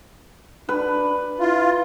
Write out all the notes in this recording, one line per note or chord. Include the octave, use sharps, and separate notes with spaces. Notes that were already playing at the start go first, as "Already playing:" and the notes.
D4 B4
E4 F4